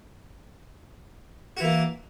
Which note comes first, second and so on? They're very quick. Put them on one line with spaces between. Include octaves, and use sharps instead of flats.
F#4 E3 A#3